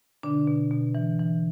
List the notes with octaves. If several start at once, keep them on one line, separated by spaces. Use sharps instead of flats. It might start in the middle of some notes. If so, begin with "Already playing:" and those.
B2 D3 D4
B2
B2
E3
E3